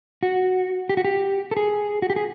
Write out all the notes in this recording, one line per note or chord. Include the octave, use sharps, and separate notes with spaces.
F#4
G4
F#4
G4
A4
G#4
F#4
G4
G#4